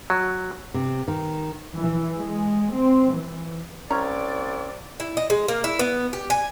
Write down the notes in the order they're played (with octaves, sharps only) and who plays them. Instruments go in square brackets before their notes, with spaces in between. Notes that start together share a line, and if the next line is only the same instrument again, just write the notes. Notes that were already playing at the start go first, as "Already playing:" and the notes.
[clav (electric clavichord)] F#3
[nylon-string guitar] C3
D#3
[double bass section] E3
G#3
C4
E3
[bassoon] C2 [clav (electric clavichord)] C#4 [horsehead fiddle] D5 [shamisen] A#5
[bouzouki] E4
D#5
G#3
A#3
E4
B3
G4
G#5